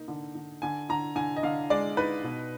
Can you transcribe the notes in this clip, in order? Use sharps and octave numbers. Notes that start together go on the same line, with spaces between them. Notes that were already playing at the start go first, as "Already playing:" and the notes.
Already playing: A#3 D#4
D3
D3
D3 G#5
D3 A#5
D3 G#5
D#5
D3 F5
G#3 D5
D#4 B4
B2